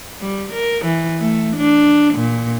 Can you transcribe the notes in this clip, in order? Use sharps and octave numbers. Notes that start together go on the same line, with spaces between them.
G3
A#4
E3
A3
D4
A#2